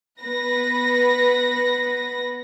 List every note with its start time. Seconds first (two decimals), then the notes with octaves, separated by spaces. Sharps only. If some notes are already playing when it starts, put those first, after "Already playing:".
0.21 B3 B4 A#6